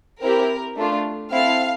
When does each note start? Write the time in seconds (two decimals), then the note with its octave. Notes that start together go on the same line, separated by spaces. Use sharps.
0.21 C4 E4 G4 A#4
0.77 A3 D4 F4
1.31 C4 E4 A4 F5